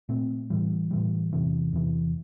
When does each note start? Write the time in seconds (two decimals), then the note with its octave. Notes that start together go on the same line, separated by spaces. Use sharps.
0.09 A#2 A3 C4
0.50 A2 E3 G3
0.91 A2 E3 G3
1.33 E2 C3 E3
1.73 E2 C3 E3